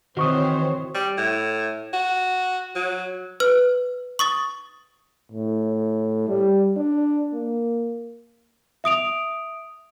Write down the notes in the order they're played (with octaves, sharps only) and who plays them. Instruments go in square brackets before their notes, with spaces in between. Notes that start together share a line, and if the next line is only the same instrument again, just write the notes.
[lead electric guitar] D#3 E3 [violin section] C4 C5 C#5 [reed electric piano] F#4 C#6 D#6
[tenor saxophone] G3
A2
F#4
F#3
[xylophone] B4 F6
C#6 D#6 A6
[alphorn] A2
G3
D4
A#3
[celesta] E5 D#6 D7 F7